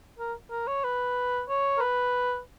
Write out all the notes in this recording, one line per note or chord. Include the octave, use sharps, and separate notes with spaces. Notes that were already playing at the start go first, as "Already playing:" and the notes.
A#4
A#4
C#5
B4
C#5
A#4
B4